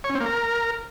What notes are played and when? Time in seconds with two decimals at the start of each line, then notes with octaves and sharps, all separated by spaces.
0.04 C#5
0.10 C#4
0.15 C4
0.20 A#3
0.26 A#4